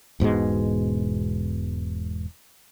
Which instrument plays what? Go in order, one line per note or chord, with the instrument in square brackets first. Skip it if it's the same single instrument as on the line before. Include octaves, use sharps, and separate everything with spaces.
[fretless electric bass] E1 G#2 B2 G#3